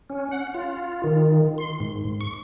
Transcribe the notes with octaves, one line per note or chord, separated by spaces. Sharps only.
C#4
F#5
F4
D#3
C6
G#2
C#6